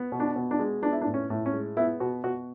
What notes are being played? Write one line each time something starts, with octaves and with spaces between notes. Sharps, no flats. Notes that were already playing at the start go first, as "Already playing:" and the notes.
Already playing: B3
B2
D4
B2
D4
G#3
B3 D4
E4
D4
A2
C#4
A2
C#4
G#3
B3 E4
B2 F#4
B2 F#4